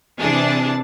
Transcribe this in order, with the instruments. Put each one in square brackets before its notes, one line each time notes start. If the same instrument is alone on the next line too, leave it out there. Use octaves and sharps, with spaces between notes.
[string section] C3 E3 D4 G#4 A5